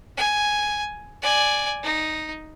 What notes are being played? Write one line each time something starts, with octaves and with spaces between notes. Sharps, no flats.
G#5
D5 G#5
D#4